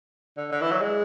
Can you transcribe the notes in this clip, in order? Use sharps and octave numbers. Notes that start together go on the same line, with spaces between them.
D3
D3
E3
F#3
G#3